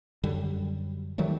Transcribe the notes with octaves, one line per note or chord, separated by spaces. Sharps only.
F#2 D3 G3
D#3 F#3 G3 A3